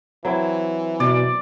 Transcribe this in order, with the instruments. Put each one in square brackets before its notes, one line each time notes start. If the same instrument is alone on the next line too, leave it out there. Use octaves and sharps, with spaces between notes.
[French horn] E3 [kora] F#3 C4 E4
[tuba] B2 [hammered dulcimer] D5